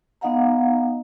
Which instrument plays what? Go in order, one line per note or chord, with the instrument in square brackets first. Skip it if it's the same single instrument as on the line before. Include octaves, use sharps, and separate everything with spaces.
[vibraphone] B3 D#4 D#5 F5 F#5 A#5